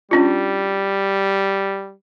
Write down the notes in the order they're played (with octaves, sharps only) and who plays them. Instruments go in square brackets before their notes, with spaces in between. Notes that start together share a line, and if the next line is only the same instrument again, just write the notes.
[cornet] G3 [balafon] C#4 D4 F4